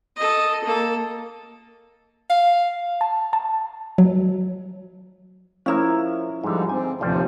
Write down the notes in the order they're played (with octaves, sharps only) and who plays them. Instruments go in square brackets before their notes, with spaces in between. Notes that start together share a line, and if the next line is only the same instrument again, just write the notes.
[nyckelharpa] A4 D#5
A#3 A4
[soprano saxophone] F5
[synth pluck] A5
A5
F#3
[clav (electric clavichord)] F3 A#4 [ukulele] C#4 E4
[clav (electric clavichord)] G#2 D3 [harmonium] F3 G3 D#4
[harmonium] C4 [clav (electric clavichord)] G#5
[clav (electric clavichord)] A1 G3 C5 [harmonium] D#2 C3 F3